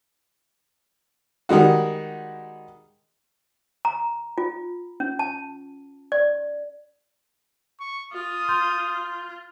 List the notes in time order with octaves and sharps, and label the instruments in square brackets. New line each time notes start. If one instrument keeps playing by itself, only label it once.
[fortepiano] D#3 G3 G#3 F#4
[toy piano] A#5
F4
C#4
A5
D5
[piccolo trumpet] C#6
[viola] F4 [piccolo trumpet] D#6
[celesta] C6 G6